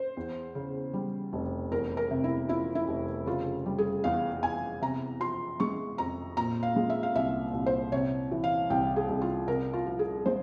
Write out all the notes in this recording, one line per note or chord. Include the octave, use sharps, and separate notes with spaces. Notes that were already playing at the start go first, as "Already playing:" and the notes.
Already playing: C5
E2
C#3
G3
F1
E2 A#4
A#4
C3
E4
F3 E4
E4
F1
C#3 F4
G3
G#4
E2 F5
E2 G#5
C3 A#5
F3 C6
G#3 C#6
F2 A#5
A#2 A#5
F5
G#3
E5
F5
C2 E5
C2
C5
C3 C#5
E3
F5
C2 G5
G#4
C2
F4
C3 A#4
F4
F3
G#4
G#3 C5